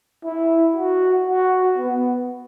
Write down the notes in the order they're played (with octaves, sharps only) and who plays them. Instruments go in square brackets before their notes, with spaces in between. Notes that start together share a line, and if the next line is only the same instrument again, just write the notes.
[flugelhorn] E4
F#4
F#4
B3